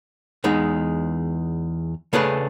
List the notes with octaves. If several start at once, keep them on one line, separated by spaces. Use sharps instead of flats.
E2 G#3 D#4
C#3 A3 D4 G#4 B4